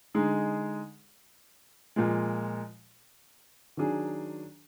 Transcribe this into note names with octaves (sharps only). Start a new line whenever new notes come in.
D3 G#3 D#4 G#4
A#2 F3 G#3
D#3 F#3 D4 G#4